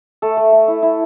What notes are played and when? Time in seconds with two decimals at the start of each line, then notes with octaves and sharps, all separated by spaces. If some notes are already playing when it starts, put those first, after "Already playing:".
0.22 A3 A4
0.37 A3
0.52 A3
0.68 E4
0.82 E4